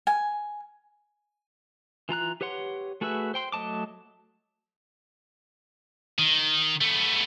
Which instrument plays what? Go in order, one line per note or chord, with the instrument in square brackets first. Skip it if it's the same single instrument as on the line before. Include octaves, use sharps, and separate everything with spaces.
[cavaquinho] G#5
[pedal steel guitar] E3 F4 A#5 F#6
G4 B4 C#5 F#5 C6
A3 F#4 G#4 B4 E5
C5 G5 C6
F#3 A3 D#5 A5 D6
[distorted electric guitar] D#3
A3 B3